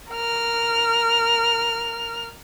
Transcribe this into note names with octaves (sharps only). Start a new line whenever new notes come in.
A#4 F6